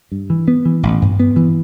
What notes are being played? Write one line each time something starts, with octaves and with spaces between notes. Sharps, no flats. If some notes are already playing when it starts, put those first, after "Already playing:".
G2
E3
B3
E3
A1
G2
B3
E3